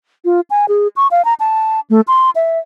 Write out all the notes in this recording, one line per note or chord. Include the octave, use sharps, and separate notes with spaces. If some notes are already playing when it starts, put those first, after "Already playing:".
F4
G#5
G#4
C#6
F5
A#5
A5
A3
C6
E5